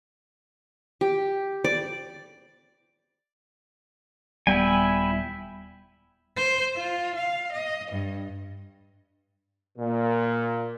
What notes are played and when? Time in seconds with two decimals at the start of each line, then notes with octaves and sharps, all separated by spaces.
1.01 G4
1.64 D5
4.47 D#1 G3 B3 E4 G5 G#5
6.36 C5
6.76 F4
7.16 F5
7.52 D#5
7.91 G2
9.77 A#2